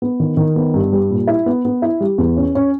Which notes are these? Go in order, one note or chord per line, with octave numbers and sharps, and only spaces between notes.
B3
D#3
D#3
B3
G2
G3
A#2
E4
B3
B3
E4
G3
E2
C#4
C#4